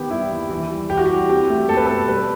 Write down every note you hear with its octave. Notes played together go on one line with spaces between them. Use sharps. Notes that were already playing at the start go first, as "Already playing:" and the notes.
Already playing: D#3 B3 G4
G3 E4
D#2
E3
G3
E3 G4
F#4
G4
G3
C4 G4
A3
C4 A4
B4
A4
B2
G3 B4